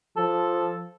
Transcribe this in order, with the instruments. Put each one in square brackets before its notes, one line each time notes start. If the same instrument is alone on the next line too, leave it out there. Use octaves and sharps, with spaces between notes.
[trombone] F3 [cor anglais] A4